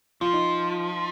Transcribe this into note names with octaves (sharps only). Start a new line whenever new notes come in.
F3 F4
D#4